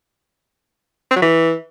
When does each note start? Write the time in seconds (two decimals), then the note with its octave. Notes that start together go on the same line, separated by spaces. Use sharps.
1.11 C4
1.16 F#3
1.22 E3